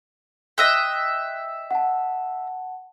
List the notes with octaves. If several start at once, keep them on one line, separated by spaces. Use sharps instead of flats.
D#5 E5 G5 C6 F#6
F#5 A5